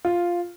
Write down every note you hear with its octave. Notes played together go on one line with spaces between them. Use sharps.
F4